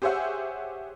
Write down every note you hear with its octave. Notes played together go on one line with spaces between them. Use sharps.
G4 G#4 C5 C#5 E5 F#5